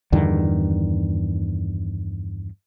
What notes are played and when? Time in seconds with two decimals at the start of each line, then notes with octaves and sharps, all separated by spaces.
0.12 E2 G2 D3 D#3